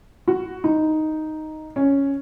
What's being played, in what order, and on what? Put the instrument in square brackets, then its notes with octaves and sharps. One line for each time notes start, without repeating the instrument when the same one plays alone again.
[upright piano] F#4
D#4
C#4